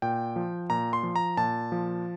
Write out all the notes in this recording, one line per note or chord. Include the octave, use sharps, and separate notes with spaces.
A#2 G5
F3
A#2 A#5
C6
F3
A#5
A#2 A5
F3